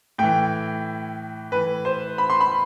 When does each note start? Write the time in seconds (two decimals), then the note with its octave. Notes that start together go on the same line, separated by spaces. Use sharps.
0.18 A2 E3 G5
1.52 A2 E3 B4
1.85 C5
2.18 B5
2.30 C6
2.41 B5